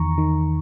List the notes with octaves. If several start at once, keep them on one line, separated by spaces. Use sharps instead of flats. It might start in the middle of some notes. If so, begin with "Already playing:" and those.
Already playing: E2 D#3 A#5 C#6
D#3